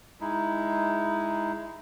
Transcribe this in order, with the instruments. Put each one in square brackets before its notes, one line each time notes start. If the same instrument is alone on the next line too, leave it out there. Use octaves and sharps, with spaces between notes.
[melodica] G#3 D#4 E4